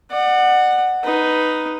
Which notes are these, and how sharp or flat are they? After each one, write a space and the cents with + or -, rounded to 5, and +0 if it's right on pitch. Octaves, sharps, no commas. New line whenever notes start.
D5 +40 F#5 +0
D#4 +0 B4 +0